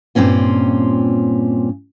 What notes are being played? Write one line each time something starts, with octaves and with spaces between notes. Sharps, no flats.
G2 A#2 C4 C#4 F4